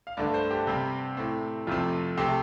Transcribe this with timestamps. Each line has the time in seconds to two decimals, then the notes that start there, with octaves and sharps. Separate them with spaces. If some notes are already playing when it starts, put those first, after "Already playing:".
0.07 F5
0.17 G2 D3 A3 D5
0.34 C5
0.51 G4
0.67 C3 G3 C4
1.17 A2 A3 C4
1.67 F2 C3 A3 C4 F4
2.17 C3 A3 C4 G4
2.25 A4